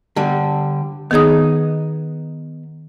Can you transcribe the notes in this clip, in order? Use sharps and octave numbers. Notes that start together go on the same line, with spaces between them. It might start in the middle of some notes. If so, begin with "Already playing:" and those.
D3 G3
D#3 B3 D#4 G#4 D#6